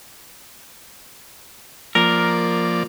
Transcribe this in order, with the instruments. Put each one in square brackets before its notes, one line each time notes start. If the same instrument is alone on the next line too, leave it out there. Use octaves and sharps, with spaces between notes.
[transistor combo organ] F3 A#3 D5 [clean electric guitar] A#4